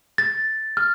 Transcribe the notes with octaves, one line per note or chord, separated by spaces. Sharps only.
A6
F6